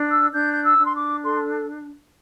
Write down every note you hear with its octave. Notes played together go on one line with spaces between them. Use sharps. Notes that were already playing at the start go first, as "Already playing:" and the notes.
Already playing: D4
E6
D4 G6
G6
E6
D4
C6
D6
A4 C6